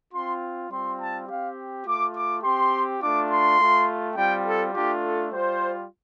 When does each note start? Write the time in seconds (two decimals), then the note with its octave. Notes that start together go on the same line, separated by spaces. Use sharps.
0.13 C4 F4 C6
0.70 G3 C4 F4 C6
0.99 A5
1.28 C4 G4 F5
1.85 A3 F4 D6
2.15 D6
2.43 C4 G4 C6
3.01 A3 D4 F4 D6
3.30 C6
3.59 A3 F4
4.16 G3 C4 F4 G5
4.44 A4
4.73 A3 D4 F4 G4
5.03 A4
5.31 G3 F4 C5